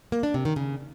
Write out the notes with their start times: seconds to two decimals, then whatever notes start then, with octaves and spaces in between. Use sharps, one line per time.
0.12 A#3
0.23 D4
0.34 C3
0.45 D#3
0.56 C#3